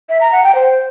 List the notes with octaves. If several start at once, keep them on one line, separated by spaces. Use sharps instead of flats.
E5
A#5
F#5
G5
C5